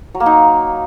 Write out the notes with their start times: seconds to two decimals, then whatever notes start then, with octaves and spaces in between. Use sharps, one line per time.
0.15 F#3
0.20 A#3
0.26 D#4